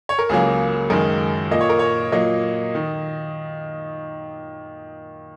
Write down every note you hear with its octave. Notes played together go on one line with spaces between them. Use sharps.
C#5
A#4
C#2 C#3 F#3 A#3 G#4
F#2 D#3 G#3 A#4
A#2 A#3 D#5
C#5
A#4
C#5
A#2 F#3 A#3 D#5
D#3